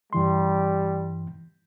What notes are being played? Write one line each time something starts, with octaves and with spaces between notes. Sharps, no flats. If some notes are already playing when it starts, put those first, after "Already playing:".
G2 E3 G3 C6